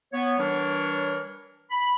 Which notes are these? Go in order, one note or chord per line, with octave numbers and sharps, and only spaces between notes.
B3 C#5
E3 G3 D4 A#4 C#5
B5